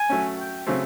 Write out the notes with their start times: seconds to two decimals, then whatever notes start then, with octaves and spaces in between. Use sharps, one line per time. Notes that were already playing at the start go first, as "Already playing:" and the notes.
Already playing: G#5
0.09 F#3 A3 C#4
0.38 G5
0.67 C#3 F#3 A3 C4